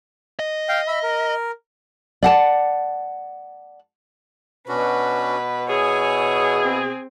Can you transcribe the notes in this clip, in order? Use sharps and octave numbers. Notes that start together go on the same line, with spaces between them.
D#5
F5 G5
E5 B5
A#4
D5 F#5 A5
B2 C#4 D4 F#4 B4
E4 G#4 C#5 G#5
C4